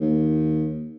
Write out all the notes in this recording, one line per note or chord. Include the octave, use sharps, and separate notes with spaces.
D#2